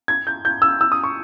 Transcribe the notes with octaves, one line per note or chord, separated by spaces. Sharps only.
G#6
G6
G6
E6
E6
D#6
C#6